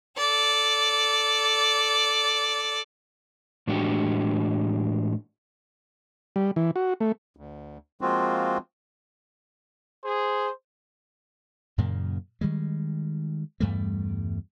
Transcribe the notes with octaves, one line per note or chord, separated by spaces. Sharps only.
A4 D5
A2 E3 G#3 D4 F#4 G4
G3
E3
F#4
A3
D2
F3 G#3 A#3 C4 F4 F#4
G#4 C5
F#2 A#2 C#3 A#3
D#3 G3 G#3
E2 G2 G3 A3